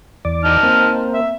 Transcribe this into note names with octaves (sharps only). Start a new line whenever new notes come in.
E2 D5
D#4 A5 F6
A#3 C4
E5